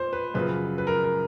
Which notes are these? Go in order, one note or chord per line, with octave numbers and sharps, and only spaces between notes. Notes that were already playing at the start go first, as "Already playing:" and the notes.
Already playing: A#2 C5
B4
F#2 C#3 F3 B4
B4
A#4
A#4